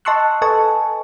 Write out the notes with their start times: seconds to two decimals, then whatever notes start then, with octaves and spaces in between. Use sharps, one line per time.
0.05 D#5 A5 C6 C#6 E6 F#6
0.42 A4 B4 D#5 G#5 A5 C#6